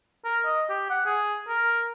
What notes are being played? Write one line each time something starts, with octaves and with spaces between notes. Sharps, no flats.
A#4
D#5
G4
F#5
G#4
A#4